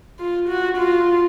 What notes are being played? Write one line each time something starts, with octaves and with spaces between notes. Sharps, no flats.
F4
F#4
F4